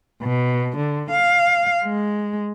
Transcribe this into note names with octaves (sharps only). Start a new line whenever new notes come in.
B2
D3
F5
G#3